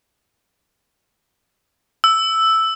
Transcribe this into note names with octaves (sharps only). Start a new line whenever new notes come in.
E6